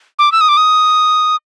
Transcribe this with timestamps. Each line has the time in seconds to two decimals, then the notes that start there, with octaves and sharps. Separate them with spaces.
0.19 D6
0.32 E6
0.41 D#6
0.49 D6
0.57 D#6